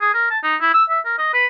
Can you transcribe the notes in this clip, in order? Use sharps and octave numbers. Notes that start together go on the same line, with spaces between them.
G#4
A#4
A5
D#4
E4
E6
E5
A#4
D#5
B4